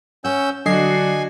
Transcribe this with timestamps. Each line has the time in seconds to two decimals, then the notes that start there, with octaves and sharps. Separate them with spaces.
0.25 C#4 C#5 F#5 E6 G6
0.66 D3 F#3 D4 F#4 D#5 G#5 C7